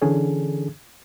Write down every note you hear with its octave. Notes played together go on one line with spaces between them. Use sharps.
D3 E3 C#4 D4 G#4 A4